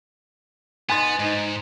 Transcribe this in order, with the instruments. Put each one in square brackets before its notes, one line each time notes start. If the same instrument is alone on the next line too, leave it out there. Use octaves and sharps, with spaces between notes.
[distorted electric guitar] B3 [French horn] D#4 [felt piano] G#5 C6 A6
[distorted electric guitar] G#2 [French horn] D#4